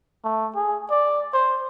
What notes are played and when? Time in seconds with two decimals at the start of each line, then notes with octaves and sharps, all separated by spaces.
0.25 A3
0.55 G#4
0.91 D5
1.33 C5